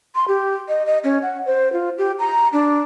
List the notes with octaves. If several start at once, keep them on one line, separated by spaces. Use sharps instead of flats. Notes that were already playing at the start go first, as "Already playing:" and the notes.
C6
G4
D#5
D#5
C#4
F#5
C5
F4
G4
A#5
D4